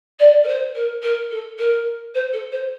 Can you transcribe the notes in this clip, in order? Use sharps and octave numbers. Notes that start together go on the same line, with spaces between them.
D5
A#4
C5
A#4
A#4
A4
A#4
C5
A4
C5